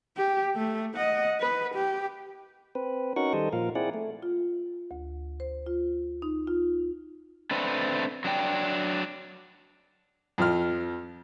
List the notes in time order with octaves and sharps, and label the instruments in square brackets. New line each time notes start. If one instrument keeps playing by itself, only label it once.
[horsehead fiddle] G4
A3
D#5 F#5
B4
G4
[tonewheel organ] C4 B4
C#4 D#4 F#4 A#4 F#5 C#6
D#3 G3 A4 C5 D#5
A#2 F3 A#4 F5
C4 E4 G#4 D5 F#5
A3
[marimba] F4
D2
C5
F4
D#4
F4
[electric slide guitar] A3 C4 D4 B4
F#3 D4 G5
[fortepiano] F2 F3 F6